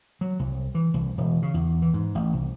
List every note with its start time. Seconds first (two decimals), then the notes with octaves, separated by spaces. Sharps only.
0.21 F#3
0.39 C2
0.75 E3
0.94 C2
1.18 E1
1.42 C#3
1.54 E2
1.82 E3
1.94 G#2
2.15 A1
2.33 C2